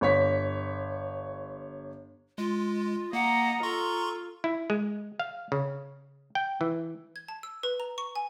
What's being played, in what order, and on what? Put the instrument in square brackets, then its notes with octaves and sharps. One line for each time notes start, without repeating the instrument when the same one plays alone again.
[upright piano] G1 C#5 B6
[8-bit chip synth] G#3 [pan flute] F4
[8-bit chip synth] A#3 [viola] D#5 A#5 [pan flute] F#5
[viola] F4 [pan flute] A4 [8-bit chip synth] A#5 C6 C#6
[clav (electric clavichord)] E4
G#3
F5
C#3
G5
E3
[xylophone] G#6
A5
E6
B4
A#5
C#6
G#5